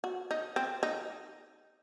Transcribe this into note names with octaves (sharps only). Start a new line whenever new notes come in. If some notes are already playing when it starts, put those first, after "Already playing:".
F#4
D#4
C4
D#4